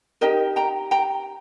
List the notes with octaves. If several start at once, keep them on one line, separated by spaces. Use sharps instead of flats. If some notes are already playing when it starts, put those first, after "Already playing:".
D#4 G4 A#4 D#5 G5
G5 A#5
G5 A#5